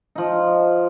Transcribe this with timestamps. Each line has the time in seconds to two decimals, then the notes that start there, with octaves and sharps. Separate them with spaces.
0.15 F3 D#4